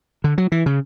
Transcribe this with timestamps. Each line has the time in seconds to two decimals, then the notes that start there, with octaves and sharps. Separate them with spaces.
0.24 D3
0.38 F#3
0.52 E3
0.66 C#3